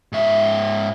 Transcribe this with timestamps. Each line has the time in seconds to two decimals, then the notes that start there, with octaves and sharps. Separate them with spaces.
0.12 G#2 E5